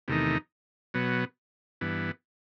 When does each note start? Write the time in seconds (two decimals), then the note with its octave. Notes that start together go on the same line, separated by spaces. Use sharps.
0.08 E2 C3 D#3 A3 D#4
0.94 B2 F#3 B3
1.81 G2 E3 B3